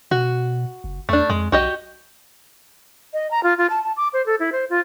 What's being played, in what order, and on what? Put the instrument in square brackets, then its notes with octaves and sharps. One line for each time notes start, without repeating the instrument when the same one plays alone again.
[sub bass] B2 [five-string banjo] F#4
[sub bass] F#1
[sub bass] E2 [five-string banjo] A3 D4
[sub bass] F2 [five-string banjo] G#3
[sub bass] B1 [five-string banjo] F#4 G4 D#5
[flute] D#5
A#5
F4
F4
A5
A5
D6
C5
A4
E4
C5
F4